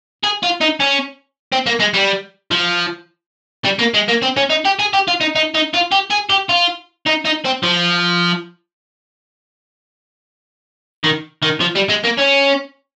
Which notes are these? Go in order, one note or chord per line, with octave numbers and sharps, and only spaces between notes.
G#4
F4
D#4
C#4
C4
A#3
G#3
G3
F3
G3
A#3
G#3
A#3
C4
C#4
D#4
G4
G#4
G4
F4
D#4
D#4
D#4
F4
G4
G#4
G4
F4
D#4
D#4
C4
F3
D#3
D#3
F3
G3
G#3
A#3
C#4